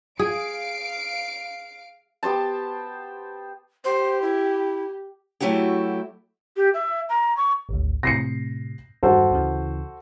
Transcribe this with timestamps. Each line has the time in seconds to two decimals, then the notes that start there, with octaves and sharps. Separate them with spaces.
0.19 G#4 F5 C7 D7
2.23 B3 G4 C5 A5
3.85 G4 C5
4.22 E4
5.41 F#3 A3 E4 F#4 G4
6.56 G4
6.74 E5
7.09 A#5
7.37 C#6
7.69 G#1 D2
8.03 A2 C3 A#6 C7 C#7
9.03 E2 G2 D#3 F#4 A4 C5
9.30 D2 C#3 E3